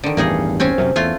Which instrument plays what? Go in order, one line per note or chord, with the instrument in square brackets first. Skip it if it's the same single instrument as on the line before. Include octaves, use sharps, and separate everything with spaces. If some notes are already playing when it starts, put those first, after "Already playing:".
[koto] D3 D#3
[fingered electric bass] A1 E2 G2 [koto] A#3 D#4 G#4
[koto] C4 C#4 G#5
[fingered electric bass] F#2 A2 C3
[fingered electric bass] E2 [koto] A3 F4 G#5